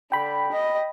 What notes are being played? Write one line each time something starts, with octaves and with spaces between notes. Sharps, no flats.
D3 G5 B5
D#5